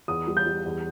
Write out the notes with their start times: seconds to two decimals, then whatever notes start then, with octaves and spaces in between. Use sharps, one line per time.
0.08 E2 D#6
0.27 G3
0.37 G6
0.46 G3
0.65 E2